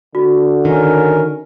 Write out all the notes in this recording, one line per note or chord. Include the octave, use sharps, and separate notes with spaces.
D3 F#4
D#3 C#4 A#4